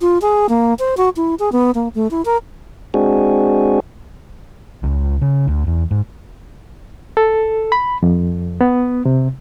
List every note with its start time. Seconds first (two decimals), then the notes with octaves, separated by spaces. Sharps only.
0.01 F4
0.22 G#4
0.49 A#3
0.79 C5
0.97 F#4
1.16 E4
1.39 G#4
1.52 B3
1.75 A#3
1.95 A3
2.11 E4
2.25 A#4
2.94 G#3 C4 D4 F#4 G#4
4.83 C#2
5.22 C#3
5.48 D2
5.67 E2
5.91 G#2
7.17 A4
7.72 B5
8.03 F2
8.61 B3
9.05 C3